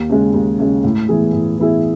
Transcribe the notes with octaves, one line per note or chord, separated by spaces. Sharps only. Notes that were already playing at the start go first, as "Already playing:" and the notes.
Already playing: D#2
C#3 G#3
D#2
C#3 G#3
A2
E3 B3 E4 G#4
A2
E3 B3 E4 G#4